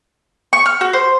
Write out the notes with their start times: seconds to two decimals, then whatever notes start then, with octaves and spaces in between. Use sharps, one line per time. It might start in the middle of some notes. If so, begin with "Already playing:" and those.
0.53 C#6
0.66 F6
0.81 F#4
0.93 C5